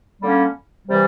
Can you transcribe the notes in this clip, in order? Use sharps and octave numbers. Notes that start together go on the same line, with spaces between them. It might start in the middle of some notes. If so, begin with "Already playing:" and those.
D3 G3 A#3 C#4
C3 E3 G3